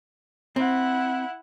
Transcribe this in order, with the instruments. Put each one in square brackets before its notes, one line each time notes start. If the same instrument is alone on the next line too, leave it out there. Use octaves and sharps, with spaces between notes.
[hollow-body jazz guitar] C4 [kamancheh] E4 F#5